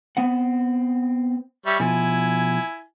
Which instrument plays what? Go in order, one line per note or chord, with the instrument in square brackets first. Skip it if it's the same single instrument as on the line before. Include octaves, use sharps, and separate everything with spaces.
[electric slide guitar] B3 C4 F#5
[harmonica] G3 C#5 E5
[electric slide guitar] B2 F3 [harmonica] E4 G#5